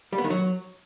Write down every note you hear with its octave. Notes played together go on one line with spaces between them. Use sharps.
G3
B3
D#3
F#3